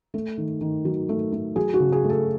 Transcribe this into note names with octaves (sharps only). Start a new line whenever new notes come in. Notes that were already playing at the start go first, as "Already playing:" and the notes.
A3
D#3
D#3
F#3
A3
A3
F#3 G#4
F#4
C#3
G#4
A3
A4